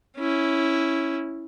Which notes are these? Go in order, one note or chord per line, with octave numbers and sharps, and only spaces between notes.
C#4 E4